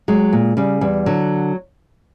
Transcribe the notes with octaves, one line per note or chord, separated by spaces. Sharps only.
F#3 G#3
A#2
C#3 G3
E2 G3
D3 F#3